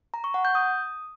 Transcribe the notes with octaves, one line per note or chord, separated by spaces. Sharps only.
A#5
C#6
F#5
G6
D#6